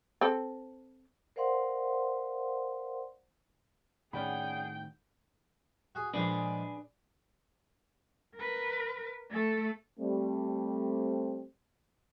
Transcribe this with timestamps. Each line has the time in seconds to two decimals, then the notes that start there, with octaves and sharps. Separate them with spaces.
0.21 C4 A4
1.36 A#4 C5 D5 F5 F#5 C6
4.13 A2 D#3 C#4 G#4 D5 F#5 G5 B5
5.95 F#4 G#4
6.14 A#2 F3 G#3 D4 G#4 B4
8.36 A#4 B4
9.30 A3 A4
9.99 G3 A3 C4